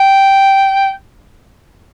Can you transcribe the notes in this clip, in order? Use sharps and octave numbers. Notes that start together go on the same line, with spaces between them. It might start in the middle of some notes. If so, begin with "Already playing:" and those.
Already playing: G5